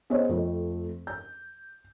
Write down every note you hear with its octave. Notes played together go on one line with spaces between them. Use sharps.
B3 G#4 C5 C#5 D#5
F2 A3
G6